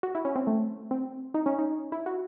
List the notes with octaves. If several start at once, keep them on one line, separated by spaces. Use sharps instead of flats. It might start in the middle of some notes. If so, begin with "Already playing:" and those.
F#4
E4
C#4
C4
A3
C4
D#4
C#4
D#4
E4
F#4